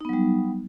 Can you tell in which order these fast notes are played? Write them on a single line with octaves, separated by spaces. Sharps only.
D#4 B3 F#3 G3